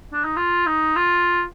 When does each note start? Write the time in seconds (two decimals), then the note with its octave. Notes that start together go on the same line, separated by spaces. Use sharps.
0.13 D4
0.24 D#4
0.37 F4
0.66 D#4
0.96 F4